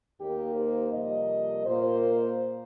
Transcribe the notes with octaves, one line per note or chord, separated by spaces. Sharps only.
D#2 D#3 A#3 G4
C5
F2 C3 G3 A#3 D#5
A#2 A#3 C5